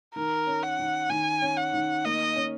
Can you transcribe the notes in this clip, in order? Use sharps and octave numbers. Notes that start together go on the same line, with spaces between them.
D#3 A#4
C#4
F#5
D#3
D#3 G#5
C#4
F#5
D#3
A#3 D#5
C#4